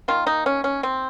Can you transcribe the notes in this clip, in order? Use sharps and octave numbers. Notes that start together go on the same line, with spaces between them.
D#3 A#3 F4
D#4
C#4
C#4
C4